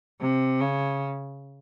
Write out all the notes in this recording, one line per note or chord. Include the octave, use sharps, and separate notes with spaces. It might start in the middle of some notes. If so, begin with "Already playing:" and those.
C3
C#3